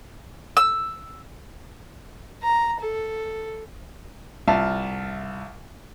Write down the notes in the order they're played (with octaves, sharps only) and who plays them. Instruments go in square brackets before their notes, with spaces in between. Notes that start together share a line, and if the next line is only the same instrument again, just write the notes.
[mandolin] E6
[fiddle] A#5
A4
[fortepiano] C2 F4 E5 F5 A5